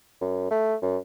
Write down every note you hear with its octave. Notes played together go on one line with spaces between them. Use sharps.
F#2
A3
F#2